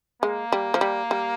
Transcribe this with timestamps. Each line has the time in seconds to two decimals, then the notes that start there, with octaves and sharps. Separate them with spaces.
0.22 G#3 A#3
0.52 G3
0.74 F3
0.81 G3
1.11 G3